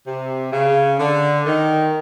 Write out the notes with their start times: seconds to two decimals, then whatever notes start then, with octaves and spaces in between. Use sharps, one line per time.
0.05 C3
0.52 C#3
0.99 D3
1.46 D#3